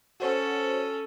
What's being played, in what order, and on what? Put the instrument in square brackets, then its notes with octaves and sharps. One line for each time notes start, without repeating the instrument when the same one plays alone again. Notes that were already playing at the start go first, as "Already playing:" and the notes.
[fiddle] C#4 A4 [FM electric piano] F#4 C5 C#5